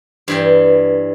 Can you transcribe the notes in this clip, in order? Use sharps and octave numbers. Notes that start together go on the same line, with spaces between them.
G2 E3 G5